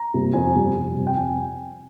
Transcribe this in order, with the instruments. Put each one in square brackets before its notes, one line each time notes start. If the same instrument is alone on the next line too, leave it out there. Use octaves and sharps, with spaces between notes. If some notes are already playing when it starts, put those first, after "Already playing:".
Already playing: [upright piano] A#5
C3 G3 A#3
F2 G#5
C3 G3 C4
F2
C3 G3 C4
G5
F2 G#5